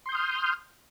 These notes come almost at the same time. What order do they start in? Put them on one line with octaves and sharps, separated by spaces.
C6 G6 D#6 F6